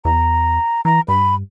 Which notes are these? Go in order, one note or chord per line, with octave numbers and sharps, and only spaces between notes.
E2 A#5
E3 A#5
G2 B5